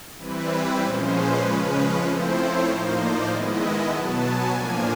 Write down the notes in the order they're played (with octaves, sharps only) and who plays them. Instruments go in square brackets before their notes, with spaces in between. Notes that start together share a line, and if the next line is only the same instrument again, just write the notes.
[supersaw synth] E3 G3 C4 E4 B4
A#2 F3 G#3 C#4 C5
B4
C#3 F3 G#3 C#4
F3 A3 C4 E4 C5
C#5
A2 F3 A#3 D#4 C5
D5
D#3 G#3 B3 E4 D#5
B2 F#3 B3 A5
G#5
A2 F3 A#3 D4